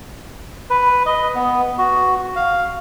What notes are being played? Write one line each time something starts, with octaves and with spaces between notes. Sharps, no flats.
B4
D#5
B3
F#4
F5